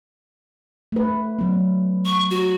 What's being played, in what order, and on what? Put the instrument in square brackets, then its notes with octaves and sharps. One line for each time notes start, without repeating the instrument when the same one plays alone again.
[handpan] A3 B4
F#3 B3
[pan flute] C#6
F#4